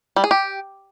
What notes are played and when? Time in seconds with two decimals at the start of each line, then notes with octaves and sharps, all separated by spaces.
0.16 G3
0.24 G#4
0.31 G4